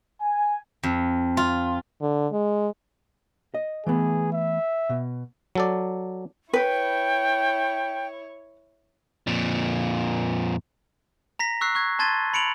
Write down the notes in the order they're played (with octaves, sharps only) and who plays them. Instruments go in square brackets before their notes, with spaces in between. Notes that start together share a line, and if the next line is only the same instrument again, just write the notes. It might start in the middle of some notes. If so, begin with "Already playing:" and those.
[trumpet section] G#5
[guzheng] F2
F4
[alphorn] D3
G#3
[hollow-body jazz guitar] D#5
[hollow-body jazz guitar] E3 A3 B3 [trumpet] G#4
[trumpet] E5
[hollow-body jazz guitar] B2
[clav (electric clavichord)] F#3 A4 D5
[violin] E4 C#5 [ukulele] B4 [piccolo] G5
[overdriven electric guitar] F2 A#2
[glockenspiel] A#5 A#6 B6
C#6 E6 F#6 B6 C7
C#6 F#6 G#6
A5 C6 G#6 A6 D#7 G7
B5 C#7 D7 F7 F#7